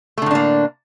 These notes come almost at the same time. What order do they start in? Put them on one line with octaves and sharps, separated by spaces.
A3 D3 A2 D4 A#3